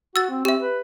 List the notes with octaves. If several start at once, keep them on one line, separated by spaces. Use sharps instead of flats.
F#4 E6 A6
C4
C4 G4 E5
B4